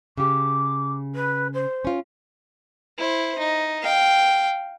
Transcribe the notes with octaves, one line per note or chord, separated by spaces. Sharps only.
C#3 G4 D6
B4
C5
C#4 F4
E4 C5
D#4
F5 G5